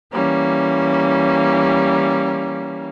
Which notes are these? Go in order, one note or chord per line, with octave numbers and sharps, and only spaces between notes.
E3 G3 A#3 C#4